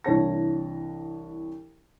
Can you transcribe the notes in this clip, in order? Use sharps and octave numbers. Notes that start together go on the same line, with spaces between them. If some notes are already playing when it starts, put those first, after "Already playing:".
C2 E3 D4 C#5 A5 A#6